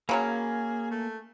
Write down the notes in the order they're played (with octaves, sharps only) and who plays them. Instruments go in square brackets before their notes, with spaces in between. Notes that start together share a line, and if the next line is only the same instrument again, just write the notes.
[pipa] C#3 F#3 C#4 [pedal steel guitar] A#3 [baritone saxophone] G#4
[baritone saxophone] A3